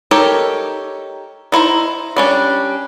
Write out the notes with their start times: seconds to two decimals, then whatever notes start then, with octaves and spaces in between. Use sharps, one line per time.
0.11 D#4 G4 A4 A#4 C#5
1.52 D#4 E4 C5 A#5
2.16 G3 C#4 D4